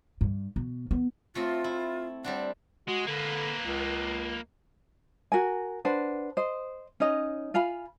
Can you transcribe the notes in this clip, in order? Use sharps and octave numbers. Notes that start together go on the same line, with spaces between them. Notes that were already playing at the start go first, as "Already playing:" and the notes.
G2
B2
B3
A3 C4 F4 D#5
E4
G3 C4 D4 F#5
G#3 F#4
D3 A#3 B4
C#2
F#4 A#4 G#5
D4 B4 C5 F#5
C5 D#5
C#4 D#4 D#5
F4 F5 G#5 B5